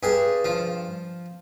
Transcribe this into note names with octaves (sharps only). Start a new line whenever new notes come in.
G2 G#4
F3